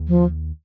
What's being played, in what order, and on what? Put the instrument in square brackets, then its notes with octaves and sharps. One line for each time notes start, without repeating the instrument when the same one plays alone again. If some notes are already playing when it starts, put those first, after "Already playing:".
Already playing: [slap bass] D#2
[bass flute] F3